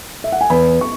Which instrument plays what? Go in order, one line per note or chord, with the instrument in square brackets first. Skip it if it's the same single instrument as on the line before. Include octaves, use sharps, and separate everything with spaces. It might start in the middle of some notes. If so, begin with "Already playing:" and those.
[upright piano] E5
F#5
G#5
[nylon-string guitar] E2 [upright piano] B5
[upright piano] C#6